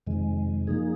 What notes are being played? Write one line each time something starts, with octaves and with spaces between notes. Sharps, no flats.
F2 C3 D#3 G#3
F#2 F3 A#3 D#4 G#4